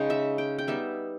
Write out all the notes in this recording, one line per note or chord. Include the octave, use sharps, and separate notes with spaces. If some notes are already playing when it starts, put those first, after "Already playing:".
Already playing: C#3 G#3 D#4 G5
E5
G5
G5
G3 B3 D#4 E5